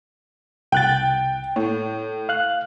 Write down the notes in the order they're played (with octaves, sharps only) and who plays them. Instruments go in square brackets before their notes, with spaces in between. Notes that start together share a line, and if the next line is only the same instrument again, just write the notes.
[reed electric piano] C2 F#6 A6 [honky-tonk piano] G5
[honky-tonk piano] A2 [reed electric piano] C#5
[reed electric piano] F5 F#6